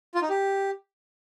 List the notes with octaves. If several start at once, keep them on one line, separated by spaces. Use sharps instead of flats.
F4
D#4
G4